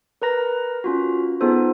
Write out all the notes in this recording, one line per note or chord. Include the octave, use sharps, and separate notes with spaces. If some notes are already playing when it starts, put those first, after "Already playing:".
A#4 B4 A#5 A#6
C#4 F4 F#4
B3 D#4 F4 G#4 A4 C5